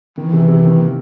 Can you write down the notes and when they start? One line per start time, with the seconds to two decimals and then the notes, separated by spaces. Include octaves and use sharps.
0.18 D#3 E3
0.33 C3
0.48 C3
0.64 D#3
0.79 A#3